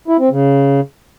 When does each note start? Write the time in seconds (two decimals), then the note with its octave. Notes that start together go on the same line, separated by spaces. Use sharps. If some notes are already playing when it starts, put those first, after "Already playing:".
0.08 E4
0.19 C4
0.31 C#3